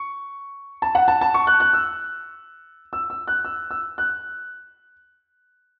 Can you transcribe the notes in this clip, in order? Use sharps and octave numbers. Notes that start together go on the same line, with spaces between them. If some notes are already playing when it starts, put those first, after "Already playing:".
Already playing: C#6
A5
F#5
A5
A5
C#6
F#6
F#6
E6
E6
E6
F#6
E6
E6
F#6